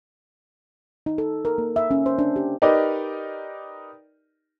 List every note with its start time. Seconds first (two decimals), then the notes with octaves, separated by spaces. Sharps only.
1.06 D#4
1.18 A4
1.45 A#4
1.58 A#3
1.76 E5
1.91 C#4
2.06 C5
2.19 D4
2.36 G4
2.62 D#4 G4 A#4 B4 D5 D#5